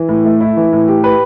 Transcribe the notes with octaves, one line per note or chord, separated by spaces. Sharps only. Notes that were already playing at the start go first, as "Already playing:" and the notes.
Already playing: E3
A2
A3
E4
E3
A2
G4
B4